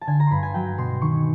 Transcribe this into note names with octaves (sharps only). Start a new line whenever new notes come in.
A5
D3 G#5
A#5
G2 B5 C6
G#5
F#3 G5
B2 C6
D#3 C#6